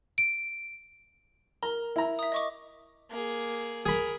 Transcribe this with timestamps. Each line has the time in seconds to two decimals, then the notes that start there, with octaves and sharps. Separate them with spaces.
0.18 D7
1.63 A#4 A#5
1.96 E4 A#5
2.19 E5 D#6
2.32 D#5 C#6 D6
3.11 A#3 G#4
3.86 G#4 A#4 B5